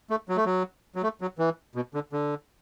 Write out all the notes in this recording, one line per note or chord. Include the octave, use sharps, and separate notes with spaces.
A3
F#3
A3
F#3
F#3
A3
F#3
E3
B2
D3
D3